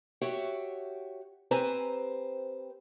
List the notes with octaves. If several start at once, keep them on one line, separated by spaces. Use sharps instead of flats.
F#4 G4 C#5 E5 F#5
C4 G4 B4 C5 G#5 A#5